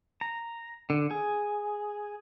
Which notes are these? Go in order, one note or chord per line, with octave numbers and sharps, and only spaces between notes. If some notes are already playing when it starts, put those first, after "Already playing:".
A#5
D3
G#4